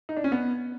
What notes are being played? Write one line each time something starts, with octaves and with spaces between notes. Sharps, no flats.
D#4
D4
C#4
B3